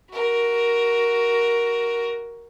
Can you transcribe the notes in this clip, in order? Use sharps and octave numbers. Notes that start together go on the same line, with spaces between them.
F#4 A#4